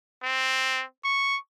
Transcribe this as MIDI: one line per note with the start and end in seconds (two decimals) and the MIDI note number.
0.24 0.84 60
1.05 1.38 85